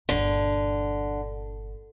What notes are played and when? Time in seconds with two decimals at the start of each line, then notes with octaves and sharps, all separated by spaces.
0.09 G1 A#2 D3